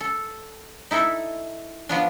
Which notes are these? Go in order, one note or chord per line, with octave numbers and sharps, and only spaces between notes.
A4
D#4 E4 A4 E5
F3 B3 D4